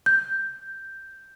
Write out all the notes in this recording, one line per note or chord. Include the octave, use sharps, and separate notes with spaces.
G6